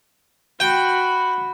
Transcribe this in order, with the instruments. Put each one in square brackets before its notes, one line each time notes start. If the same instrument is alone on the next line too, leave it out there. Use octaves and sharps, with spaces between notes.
[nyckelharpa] F#4 B5 [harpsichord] G5